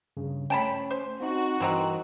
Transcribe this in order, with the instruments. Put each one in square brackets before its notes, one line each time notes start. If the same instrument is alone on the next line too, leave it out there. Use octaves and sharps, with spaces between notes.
[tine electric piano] G2 C#3
[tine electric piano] A3 C#4 [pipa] G5 A5 B5
[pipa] C5
[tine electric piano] C4 D#4 [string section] F#4
[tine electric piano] G2 E3 [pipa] A#3 C4 D#4